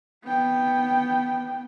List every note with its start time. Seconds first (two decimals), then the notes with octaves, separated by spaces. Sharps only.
0.24 B3 G5